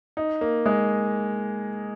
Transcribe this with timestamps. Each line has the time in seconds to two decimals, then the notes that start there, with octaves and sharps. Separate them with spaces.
0.17 D#4
0.41 A#3
0.66 G#3